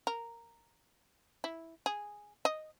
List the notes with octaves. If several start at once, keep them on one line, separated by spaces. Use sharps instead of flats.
A#4
E4
G#4
D#5